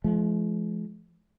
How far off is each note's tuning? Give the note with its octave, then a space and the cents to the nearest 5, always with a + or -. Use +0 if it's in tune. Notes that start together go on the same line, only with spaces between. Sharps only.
F3 -25 G#3 +40